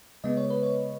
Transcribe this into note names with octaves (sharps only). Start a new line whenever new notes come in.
C#3 G#3 B3 D#5
C#5
B4
C#5